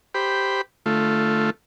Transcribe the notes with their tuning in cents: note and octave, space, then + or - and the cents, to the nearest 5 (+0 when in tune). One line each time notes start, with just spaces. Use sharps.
G4 +0 C5 -5 B5 +0
D3 +35 A3 +0 F4 +0